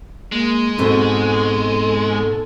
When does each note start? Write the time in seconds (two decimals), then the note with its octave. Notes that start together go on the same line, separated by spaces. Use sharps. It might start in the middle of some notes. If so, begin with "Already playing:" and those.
0.32 G#3 A#3
0.78 G#2 B2 C4 A4